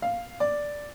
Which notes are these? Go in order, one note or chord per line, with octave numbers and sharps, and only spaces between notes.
F5
D5